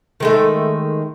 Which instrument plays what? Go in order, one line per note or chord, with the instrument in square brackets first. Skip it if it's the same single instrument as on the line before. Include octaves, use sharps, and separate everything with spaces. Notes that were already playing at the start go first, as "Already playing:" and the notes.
[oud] D#3 G#3 A3